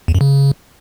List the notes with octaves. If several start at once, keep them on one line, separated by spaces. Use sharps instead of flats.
E2
F#2
C#3